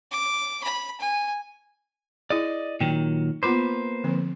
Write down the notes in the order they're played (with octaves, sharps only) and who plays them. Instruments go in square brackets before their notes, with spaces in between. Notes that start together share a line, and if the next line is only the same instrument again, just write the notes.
[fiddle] D6
B5
G#5
[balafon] E4 G#4 [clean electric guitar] D5 D#5
[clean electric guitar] A#2 D#3 F#3 [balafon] G5
[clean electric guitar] A#3 B4 C5 [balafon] B3 F4 D6
[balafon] D3 F3 C4